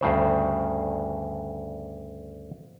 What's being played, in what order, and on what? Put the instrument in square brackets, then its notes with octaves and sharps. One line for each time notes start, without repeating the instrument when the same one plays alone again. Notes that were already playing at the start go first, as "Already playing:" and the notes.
[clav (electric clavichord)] D2 G2 C#3 C5